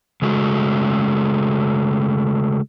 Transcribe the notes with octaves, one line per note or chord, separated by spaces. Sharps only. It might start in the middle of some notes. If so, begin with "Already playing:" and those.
C#3 G#3 A3 F#4